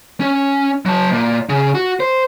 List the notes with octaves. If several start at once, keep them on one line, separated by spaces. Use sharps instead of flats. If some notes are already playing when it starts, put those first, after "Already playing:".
C#4
F#3 A5
A#2
C#3
F#4
C5